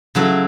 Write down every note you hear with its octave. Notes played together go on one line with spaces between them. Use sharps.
C#3 F#3 A3 E4